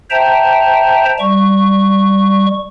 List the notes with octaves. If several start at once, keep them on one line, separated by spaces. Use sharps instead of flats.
C5 E5 G5 A5 A#5
G3 C#6